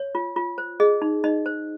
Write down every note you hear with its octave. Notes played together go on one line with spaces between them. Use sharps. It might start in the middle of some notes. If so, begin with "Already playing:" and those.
Already playing: C#5
F4
F4
C5
G#4 D#5
D#4
D#4 D#5
C5